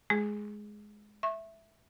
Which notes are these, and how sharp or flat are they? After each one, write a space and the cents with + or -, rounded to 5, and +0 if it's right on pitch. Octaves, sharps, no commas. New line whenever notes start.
G#3 +10 G#4 +0
E5 +0 C#6 -30